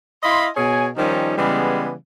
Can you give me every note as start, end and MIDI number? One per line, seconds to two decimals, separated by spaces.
0.22 0.47 64
0.22 0.47 75
0.22 0.47 77
0.22 0.47 83
0.22 0.47 84
0.55 0.87 47
0.55 0.87 68
0.55 0.87 73
0.55 0.87 80
0.97 1.34 51
0.97 1.34 53
0.97 1.34 55
0.97 1.34 61
0.97 1.34 63
0.97 1.34 65
1.37 1.92 49
1.37 1.92 52
1.37 1.92 55
1.37 1.92 56
1.37 1.92 59